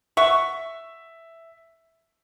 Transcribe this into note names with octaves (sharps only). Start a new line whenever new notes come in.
E5 F#5 C#6